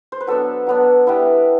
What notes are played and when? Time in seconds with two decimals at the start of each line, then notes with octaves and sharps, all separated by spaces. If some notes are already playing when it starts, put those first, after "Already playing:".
0.12 C5
0.21 B4
0.27 F#3 B3 D4 A4
0.67 F#3 B3 D4
1.07 G3 B3 E4